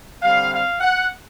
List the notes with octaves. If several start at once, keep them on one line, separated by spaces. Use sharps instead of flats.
D3 G3 C4 F5
F5
F#5